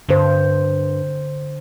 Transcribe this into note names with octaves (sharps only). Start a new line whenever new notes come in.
G2 D3 C5